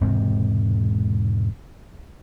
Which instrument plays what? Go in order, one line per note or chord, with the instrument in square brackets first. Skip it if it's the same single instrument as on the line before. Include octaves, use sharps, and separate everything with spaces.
[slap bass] E1 G#2 C3 C4